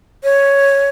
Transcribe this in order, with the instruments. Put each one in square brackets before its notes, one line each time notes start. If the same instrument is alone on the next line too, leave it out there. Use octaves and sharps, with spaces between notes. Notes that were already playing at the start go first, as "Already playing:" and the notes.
[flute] C#5